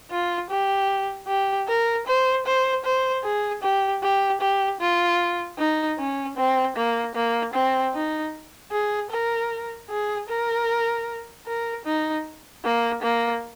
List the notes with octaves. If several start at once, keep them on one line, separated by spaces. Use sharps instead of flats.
F4
G4
G4
A#4
C5
C5
C5
G#4
G4
G4
G4
F4
D#4
C#4
C4
A#3
A#3
C4
D#4
G#4
A#4
G#4
A#4
A#4
D#4
A#3
A#3